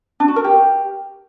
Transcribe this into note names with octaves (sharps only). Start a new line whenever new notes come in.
D4
F#4
A#4
G4